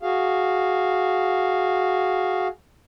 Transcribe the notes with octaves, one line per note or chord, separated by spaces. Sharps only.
F#4 G#4 F5